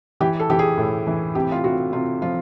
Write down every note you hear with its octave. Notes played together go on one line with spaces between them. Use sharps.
E3 G4
A4
E3 G4
G#4
A2
E3
C3 G4
F4
C3 F#4
C3 F4
F3 F4